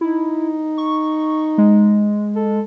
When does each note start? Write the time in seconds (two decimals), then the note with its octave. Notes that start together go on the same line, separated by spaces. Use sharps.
0.01 D#4 E4
0.78 C#6
1.58 G#3
2.36 A4